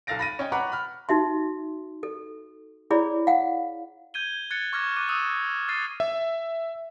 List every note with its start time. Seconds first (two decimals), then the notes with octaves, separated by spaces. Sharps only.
0.07 B1 A4 F5 A6 A#6 D7
0.19 B5 A#6 D#7
0.39 C#4 D#5 G5
0.52 B4 F#5 A#5 B5 C#6 D6
0.72 B5 F6
1.09 D#4 F#4 E5 C6
2.03 A4
2.91 E4 G#4 C#5 D5 B5
3.27 F5 F#5
4.14 G6 G#6 D#7 G7
4.51 F#6 G#6 A6 C#7
4.73 C#6 D6 F6 G#6 A#6
4.97 D6 F#6 D#7
5.09 C#6 D#6 E6 D#7
5.69 F6 G#6 A6 C7 D#7
6.00 E5